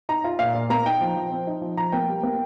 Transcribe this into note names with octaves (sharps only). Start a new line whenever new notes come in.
D#4 A#5
F4
A#2 F5
A#2
A#3 A#5
D#4 G5
F3
F3
C4
D#4
F3
F3 A#5
A#3 G5
G3
A#3